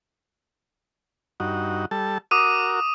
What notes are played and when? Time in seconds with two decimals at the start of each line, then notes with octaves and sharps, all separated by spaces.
1.40 G2 D#4 F#4
1.91 G3 A4 A5
2.31 F#4 A#4 D6 D#6 D#7